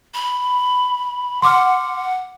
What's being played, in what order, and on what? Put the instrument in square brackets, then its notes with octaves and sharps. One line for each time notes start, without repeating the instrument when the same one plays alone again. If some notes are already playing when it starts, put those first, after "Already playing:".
[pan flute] B5
[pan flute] F#5 [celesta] C6 D6 F6